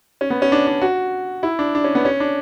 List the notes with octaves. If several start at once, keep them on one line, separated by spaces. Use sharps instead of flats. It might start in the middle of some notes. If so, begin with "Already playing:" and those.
C#4
B3
C#4
D4
D4
F#4
E4
D4
D4
C#4
B3
C#4
D4